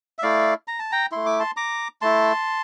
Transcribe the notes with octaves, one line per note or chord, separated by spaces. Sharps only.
E5
A3 E4 D5 F5
A#5
A5
G5 A#5
A3 E4 C6
D6
A5 C6
A#5 D6
A3 E4 A5 C6